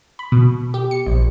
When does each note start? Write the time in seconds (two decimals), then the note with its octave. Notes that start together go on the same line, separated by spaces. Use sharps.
0.19 B5
0.32 B2
0.74 G4
0.91 C#7
1.06 A#1